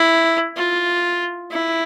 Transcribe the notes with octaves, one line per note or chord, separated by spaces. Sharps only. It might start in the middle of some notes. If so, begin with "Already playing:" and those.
Already playing: E4
F4
E4